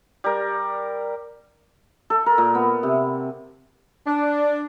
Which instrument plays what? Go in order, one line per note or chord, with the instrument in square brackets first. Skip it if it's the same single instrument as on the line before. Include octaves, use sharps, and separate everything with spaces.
[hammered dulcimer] G3 A#4
A4
A#4
A#2
B3
C3
[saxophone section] D4